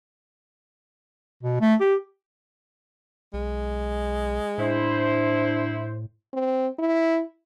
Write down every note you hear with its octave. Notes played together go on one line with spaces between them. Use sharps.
B2
A3
G4
B1 G#3
A2 D4 E4 C5
C4
E4